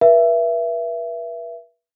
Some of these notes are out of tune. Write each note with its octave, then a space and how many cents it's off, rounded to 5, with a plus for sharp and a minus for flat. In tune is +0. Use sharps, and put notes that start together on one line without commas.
B4 -40 E5 +20